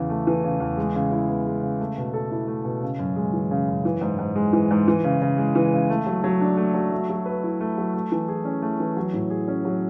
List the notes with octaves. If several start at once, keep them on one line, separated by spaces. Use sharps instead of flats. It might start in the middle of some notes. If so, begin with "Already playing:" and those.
Already playing: E2 C#3
A3
E3
C#3
E2
G#3
C#3
E4
B3
G#3
C#3
A3
B2
A4
E4
A3
B2
C#3
F#2
G#3
E3
C#3
F#2
E3
G#2
G#2
G#3
E3
G#2
E3
C#3
C#3
G#3
E3
C#3
A3
F#3
F#3
D4
A3
F#3
A3
F#3
B4
E4
A3
F#3
A3
E3
G#4
C#4
A3
E3
F#3
A2
G#4
C#4
F#3